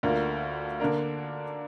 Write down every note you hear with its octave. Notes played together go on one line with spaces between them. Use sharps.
D2 D3 A#3 F4 A#4
D3 A#3 D4 A#4